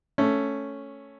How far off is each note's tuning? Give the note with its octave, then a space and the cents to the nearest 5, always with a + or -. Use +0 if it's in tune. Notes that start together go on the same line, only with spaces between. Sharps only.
A3 +0 C#4 +0